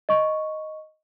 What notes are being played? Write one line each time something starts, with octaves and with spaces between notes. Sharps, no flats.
D#5 C#6